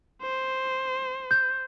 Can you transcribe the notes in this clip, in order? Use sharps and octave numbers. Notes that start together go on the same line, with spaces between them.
C5
G6